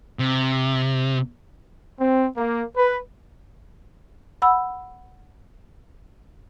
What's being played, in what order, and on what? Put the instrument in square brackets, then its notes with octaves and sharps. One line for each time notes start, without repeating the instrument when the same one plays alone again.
[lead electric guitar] C3
[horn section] C4
A#3
B4
[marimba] F#5 B5 E6